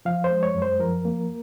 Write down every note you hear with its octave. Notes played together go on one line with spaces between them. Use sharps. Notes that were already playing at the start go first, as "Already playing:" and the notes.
F3 F5
C5
G#3
C#5
F#2
C5
F3 A#4
A#3